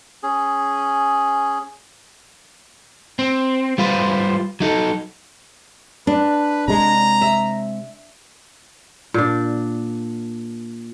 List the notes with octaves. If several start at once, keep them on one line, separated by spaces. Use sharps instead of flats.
C#4 G#4
C4
G3 F4 B4 C5
F#3 D#4 A4
D4 B4
C3 G#3 A#5
E5
A#2 D4